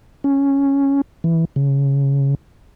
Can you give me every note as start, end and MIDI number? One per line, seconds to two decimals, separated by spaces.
0.24 1.01 61
1.24 1.45 52
1.56 2.35 49